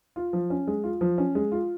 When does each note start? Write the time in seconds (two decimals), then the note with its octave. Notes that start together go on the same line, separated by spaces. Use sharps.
0.16 F4
0.33 F3
0.50 C#4
0.67 G#3
0.84 F4
1.01 F3
1.18 C#4
1.35 G#3
1.52 F4